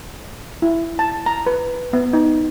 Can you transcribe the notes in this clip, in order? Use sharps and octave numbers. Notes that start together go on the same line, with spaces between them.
E4
A5
A#5
B4
B3
D#4